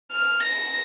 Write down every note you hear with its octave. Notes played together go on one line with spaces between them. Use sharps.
F6
A#6